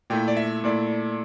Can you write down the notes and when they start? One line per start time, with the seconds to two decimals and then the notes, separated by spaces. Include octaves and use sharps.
0.10 A#2 A3 E4 G5
0.28 D5
0.37 E5
0.64 A#2 A3 E4 D5